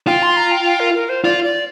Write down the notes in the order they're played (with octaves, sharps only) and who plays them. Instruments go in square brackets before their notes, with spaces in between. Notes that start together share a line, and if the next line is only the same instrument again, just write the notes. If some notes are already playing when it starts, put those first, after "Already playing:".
[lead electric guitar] F4 [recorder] G5
[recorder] C6
A#5
G5
G5
A#4
A#4
C5
[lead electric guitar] F4 [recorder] D5
[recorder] D5